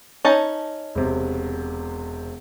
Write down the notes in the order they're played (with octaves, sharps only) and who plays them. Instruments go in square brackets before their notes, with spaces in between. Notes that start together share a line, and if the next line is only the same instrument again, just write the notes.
[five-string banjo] C#4 D#4 A5
[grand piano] E1 C3